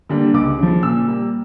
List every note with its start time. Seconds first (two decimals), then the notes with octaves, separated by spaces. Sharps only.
0.09 D3 G3 A#3
0.34 C#2 D6
0.58 C#3 F3
0.83 A#2 E6
1.08 G3 A#3